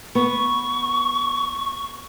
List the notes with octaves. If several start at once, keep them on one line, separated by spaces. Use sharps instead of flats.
B3 C#6